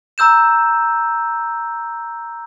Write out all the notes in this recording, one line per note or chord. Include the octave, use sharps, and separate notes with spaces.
A#5 E6 G6 E7